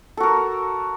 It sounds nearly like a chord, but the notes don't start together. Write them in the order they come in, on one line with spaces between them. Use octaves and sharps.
A4 F#4 A#4